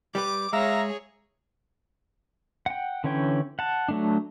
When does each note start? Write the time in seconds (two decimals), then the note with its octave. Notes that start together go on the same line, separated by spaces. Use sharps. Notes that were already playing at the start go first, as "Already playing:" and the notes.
0.15 G3 G4 B4 D6
0.53 G#3 G#4 C#5 E5 F5 A#5
2.66 F#5 G5
3.04 D3 E3 C#4 C#5 G5
3.59 F#5 A5
3.89 F#3 A3 D4